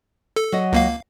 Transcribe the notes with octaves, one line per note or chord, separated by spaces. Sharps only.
A4
F#3 D#5
C#2 A#3 F5